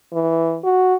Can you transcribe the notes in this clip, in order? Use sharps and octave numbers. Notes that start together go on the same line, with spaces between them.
E3
F#4